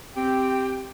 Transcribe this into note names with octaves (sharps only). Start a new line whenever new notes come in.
C4 G4 G5